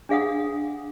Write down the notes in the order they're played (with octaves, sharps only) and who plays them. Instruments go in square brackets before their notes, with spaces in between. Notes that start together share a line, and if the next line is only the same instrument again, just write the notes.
[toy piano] D4 G#4 F5 F#5 D#6